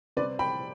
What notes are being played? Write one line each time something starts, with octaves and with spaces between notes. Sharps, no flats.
C3 G3 C4 B4 D5
G5 B5